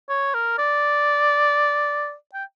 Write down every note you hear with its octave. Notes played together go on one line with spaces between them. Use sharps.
C#5
A#4
D5
G5